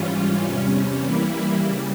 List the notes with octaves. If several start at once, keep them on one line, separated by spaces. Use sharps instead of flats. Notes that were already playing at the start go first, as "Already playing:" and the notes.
Already playing: G#2 E3 G3 C#4 F4
E2 C3 G3 C#4
E3 G3 A#3 E4
C#3 G3